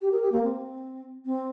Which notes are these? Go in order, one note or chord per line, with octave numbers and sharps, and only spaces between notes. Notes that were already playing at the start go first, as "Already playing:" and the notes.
G4
A#4
G4
A#3
C4
C4